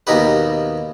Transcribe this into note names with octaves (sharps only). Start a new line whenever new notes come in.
D#2 B2 A#3 D#4 G4 B4